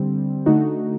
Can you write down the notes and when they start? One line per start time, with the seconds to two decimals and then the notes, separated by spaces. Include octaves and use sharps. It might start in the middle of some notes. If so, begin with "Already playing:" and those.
Already playing: D3 G3 C4
0.46 D3 A3 D#4 F#4